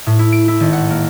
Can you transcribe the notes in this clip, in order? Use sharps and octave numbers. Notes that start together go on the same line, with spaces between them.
A2
E4
D7
E4
G#1
F#5
A#3